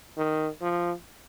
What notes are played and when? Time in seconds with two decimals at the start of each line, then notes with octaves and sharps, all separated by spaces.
0.17 D#3
0.61 F3